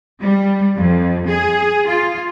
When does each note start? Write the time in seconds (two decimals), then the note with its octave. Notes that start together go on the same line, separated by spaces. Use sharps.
0.22 G3
0.77 F2
1.30 G#4
1.89 F4